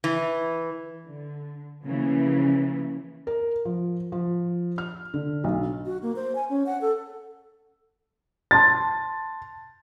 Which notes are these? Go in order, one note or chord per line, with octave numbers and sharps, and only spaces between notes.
E3
D3
C#3 E3 F3 A#3 B3 C#4
A#4
F3
F3
F6
D3
B1
F#4
A#3
C5
G#5
C#4
F#5
A4
A5 C6 A6